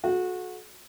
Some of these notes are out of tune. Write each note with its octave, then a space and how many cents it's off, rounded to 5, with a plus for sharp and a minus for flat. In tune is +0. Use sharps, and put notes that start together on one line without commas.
F#4 -25 A4 -40